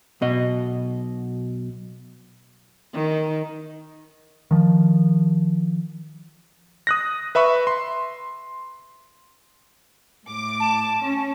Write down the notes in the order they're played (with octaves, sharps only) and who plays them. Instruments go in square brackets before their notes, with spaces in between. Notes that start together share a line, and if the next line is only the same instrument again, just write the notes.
[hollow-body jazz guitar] B1 B2 D#5
[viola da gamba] D#3
[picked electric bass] D#3 F3
[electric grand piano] D#6 F#6 A#6
B4 E5 B5 C#6
C6
[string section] A2 D6
[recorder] A5
[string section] C#4